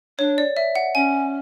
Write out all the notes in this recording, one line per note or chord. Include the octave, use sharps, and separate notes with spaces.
D4 C#5
D5
E5
F#5
C#4 G#5